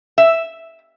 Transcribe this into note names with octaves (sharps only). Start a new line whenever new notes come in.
E5